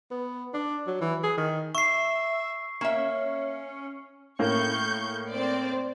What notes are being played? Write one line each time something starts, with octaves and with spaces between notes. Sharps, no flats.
B3
D4
F#3
E3
G#4
D#3
E5 C#6 C7
A#3 C#4 E5
A2 A#3 C#4 C#6 G6
C4 C5 D5